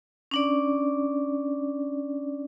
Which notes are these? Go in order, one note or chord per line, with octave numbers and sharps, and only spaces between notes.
C#4 D4 D5